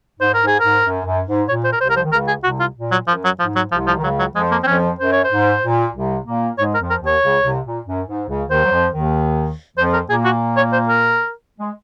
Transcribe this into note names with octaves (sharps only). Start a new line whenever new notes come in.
G#2 C5
A#4
G#2
G#4
G#2 A#4
F#2
F#2
G#2
A#2 C#5
C5
A#4
C2 C3 C5
A#4
F3 C5
D#3
C#2 C#3 A#4
G#4
C2 C3 F#4
F4
A#2
F#3
F#2 F3
F#3
G#2 F3
F#3
C2 C3 F3
F3
D#3
C#2 C#3 F#3
F#3
F2 F3 G#3
A#3
C4
F2 F3 C#4
F#2 C5
C#5
C5
G#2
A#2
C2 C3
A#2 A#3
G#2 G#3 C#5
A#4
F2 F3
A#4
D#2 D#3
C#5
C#2 C#3
C2 C3
A#2
F#2
G#2
C#2 C#3
D#2 D#3 C5
F#3
F2 F3
D#2 D#3
F2 F3 C5
A#4
A#2 A#3 G#4
F#4
C#5
C5
A#4
G#3